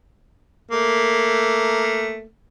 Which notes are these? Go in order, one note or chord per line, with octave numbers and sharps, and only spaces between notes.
A3 A#3